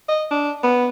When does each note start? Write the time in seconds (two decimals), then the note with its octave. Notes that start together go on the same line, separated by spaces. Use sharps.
0.09 D#5
0.31 D4
0.63 B3